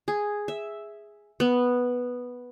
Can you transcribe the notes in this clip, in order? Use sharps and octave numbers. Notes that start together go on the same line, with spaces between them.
G#4
E5
B3